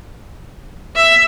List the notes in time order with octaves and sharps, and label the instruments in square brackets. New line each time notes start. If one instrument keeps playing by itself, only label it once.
[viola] E5